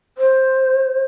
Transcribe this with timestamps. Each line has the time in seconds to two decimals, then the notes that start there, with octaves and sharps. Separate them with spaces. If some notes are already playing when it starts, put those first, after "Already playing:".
0.18 C5